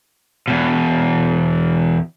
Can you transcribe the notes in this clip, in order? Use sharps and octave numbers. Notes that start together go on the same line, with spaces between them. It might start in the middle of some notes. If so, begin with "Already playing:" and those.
E2 B2